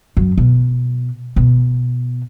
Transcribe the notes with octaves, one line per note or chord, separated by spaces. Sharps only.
F#2
B2
B2